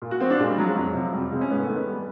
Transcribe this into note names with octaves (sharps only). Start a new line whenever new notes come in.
A#2
F#4
F3 C4
D4
A#2 G#3
G3
F3 F#3
G#3
F2 F#3
C3 F3
F2 G3
C3 F3 G#3
C#4
G#2 B3
A3
D#3
B3
G3